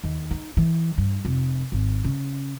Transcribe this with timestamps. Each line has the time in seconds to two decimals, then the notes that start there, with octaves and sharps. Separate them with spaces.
0.04 D#2
0.31 D#4
0.57 E3
0.98 G2
1.25 F1
1.72 G#1
2.04 C#3